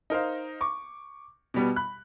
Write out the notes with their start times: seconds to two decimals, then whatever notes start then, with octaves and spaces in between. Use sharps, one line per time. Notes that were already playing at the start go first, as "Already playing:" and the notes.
0.10 D#4 A#4 C5 F5
0.61 C#6 D6
1.54 B2 G3 B3
1.76 B5 F#6